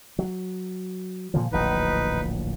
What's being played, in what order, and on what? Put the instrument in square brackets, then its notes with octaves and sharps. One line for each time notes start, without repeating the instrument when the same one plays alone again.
[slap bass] F#3
A#2 D3 F3
[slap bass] D1 A#1 E2 [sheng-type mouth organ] D#4 B4